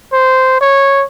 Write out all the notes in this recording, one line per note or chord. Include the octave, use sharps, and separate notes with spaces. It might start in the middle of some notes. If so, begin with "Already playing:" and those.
C5
C#5